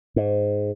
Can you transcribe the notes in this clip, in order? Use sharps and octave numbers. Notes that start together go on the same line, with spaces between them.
G#2